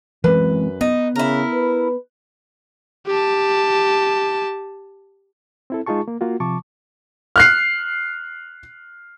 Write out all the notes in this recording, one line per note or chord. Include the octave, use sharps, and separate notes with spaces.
F#2 E3 G#3 C4 B4
B3 D#4
C#3 E4 A#4
B4
G4 A5
C4 E4 A4
G#3 D#4 F4 G#4 A5 C#6
A#3
A#3 F4 F#4
C3 F3 A5 C#6 D6
F6 F#6 C7